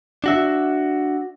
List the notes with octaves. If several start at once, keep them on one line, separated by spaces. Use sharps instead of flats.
D4 F#4 E5